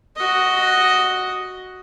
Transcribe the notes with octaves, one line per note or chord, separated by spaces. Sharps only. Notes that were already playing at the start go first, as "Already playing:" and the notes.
F#4 D#5